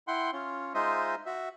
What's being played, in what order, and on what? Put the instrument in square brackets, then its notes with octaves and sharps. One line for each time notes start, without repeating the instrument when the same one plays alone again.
[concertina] E4 F#5 G5 C6
C#4 F4
G#3 D#4 F4 C5 D#5 E5
F#4 E5